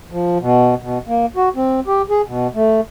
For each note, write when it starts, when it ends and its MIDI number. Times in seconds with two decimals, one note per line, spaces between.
0.12 0.38 53
0.41 0.75 47
0.82 0.98 47
1.08 1.26 58
1.36 1.49 66
1.56 1.80 60
1.87 2.02 67
2.10 2.22 68
2.28 2.47 47
2.55 2.81 57